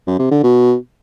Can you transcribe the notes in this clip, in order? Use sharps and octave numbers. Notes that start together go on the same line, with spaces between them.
F#2
C3
D3
B2